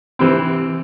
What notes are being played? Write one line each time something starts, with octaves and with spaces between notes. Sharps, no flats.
C3 E3 C4